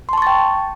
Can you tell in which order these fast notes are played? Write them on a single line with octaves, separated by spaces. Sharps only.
C6 A5 C#6 A6 G5